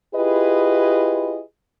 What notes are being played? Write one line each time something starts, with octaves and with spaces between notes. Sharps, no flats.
E4 F4 G4 G#4 B4 D#5